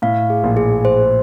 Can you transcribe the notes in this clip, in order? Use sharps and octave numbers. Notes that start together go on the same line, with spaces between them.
A2 F5
G#4
A#1 A#2
G#4
C5